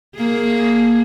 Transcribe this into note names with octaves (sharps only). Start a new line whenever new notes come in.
A#3 G#4